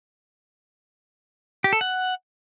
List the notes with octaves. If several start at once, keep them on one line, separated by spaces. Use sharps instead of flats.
G4
A4
F#5